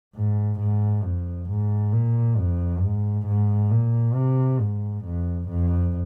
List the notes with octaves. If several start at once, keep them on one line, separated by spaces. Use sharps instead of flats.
G#2
G#2
F2
G#2
A#2
F2
G#2
G#2
A#2
C3
G#2
F2
F2